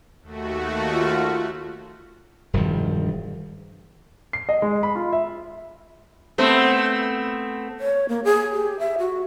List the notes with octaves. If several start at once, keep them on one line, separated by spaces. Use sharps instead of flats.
D#2 A3 F#4
F4
E1 G2 D#3 F3
C7
D#5
G#3
B5
F4
E5
A3 B3 C4
C#5
A#3
G#4
G4
E5
F#4